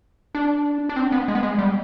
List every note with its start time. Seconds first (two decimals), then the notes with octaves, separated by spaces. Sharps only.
0.35 D4
0.89 D4
0.96 C4
1.12 B3
1.28 G#3
1.35 B3
1.43 G#3
1.59 G3